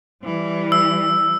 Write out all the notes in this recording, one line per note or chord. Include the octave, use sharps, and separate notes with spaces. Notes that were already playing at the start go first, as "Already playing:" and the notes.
E3 G3
E6